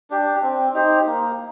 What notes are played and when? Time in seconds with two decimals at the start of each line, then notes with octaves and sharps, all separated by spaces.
0.10 D4 G4
0.43 C4
0.74 D#4 G4 C5
1.06 A#3